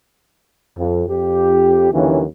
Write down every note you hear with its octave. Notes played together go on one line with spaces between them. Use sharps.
F2
F2 G4
D#2 D3 E3 F#3 A#3 C#4